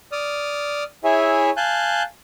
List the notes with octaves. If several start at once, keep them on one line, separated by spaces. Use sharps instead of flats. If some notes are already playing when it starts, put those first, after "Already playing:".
D5 D#6 F6
E4 G#4 C#5 E5 G#5
F5 G#5 A5 F#6 G6